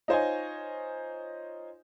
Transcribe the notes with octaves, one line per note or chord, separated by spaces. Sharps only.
D#4 F4 C5 C#5 D#5 G#5